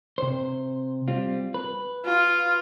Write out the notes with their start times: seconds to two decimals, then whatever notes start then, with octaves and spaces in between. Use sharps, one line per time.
0.18 C3 C5
1.08 G3 C4 F4
1.54 B4
2.05 F4